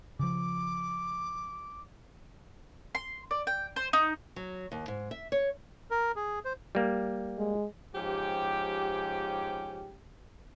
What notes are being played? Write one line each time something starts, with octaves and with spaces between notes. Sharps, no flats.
C#3 F3 D6
C6
D5
G5
C5
D#4
F#3
D#2
G#2
E5
C#5
A#4
G#4
C5
G3 A#3
G#3
G#2 F3 C#4 G4